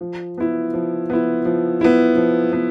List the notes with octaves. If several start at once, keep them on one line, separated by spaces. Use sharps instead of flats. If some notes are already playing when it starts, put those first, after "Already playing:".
F3
B3 E4
F3
B3 E4
F3
B3 E4
F3
B3